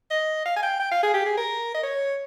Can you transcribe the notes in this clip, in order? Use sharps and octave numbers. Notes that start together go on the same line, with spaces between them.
D#5
F5
G#5
G5
G5
F5
G#4
G4
G#4
A#4
D#5
C#5